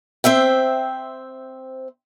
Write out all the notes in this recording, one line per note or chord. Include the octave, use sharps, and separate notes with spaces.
C4 C5 E5 G5